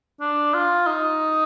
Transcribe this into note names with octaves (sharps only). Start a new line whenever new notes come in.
D4
F4
D#4